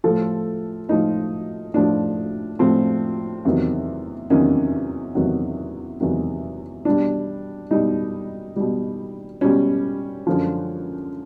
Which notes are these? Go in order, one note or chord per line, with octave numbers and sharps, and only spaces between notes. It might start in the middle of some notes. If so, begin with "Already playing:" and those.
A2 F3 A4
A2 F3 D#4
A2 F3 D4
A2 F3 C4
E2 C3 D#3 F#3
E2 C3 D#3 F#3 C#4
E2 C3 D#3 F#3
E2 C3 D#3 F#3
B2 G3 D4
B2 G3 D#4
B2 G3
B2 G3 C#4
F#2 D3 F3